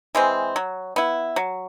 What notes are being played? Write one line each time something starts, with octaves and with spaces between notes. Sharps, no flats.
E3 G#3 C4
F#3
B3 E4
F#3